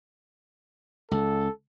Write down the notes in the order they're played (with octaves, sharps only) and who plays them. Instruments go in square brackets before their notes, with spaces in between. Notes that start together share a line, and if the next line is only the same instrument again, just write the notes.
[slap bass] C#2 [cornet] A4